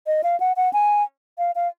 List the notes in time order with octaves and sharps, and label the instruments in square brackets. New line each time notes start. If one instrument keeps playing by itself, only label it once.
[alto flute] D#5
F5
F#5
F#5
G#5
F5
F5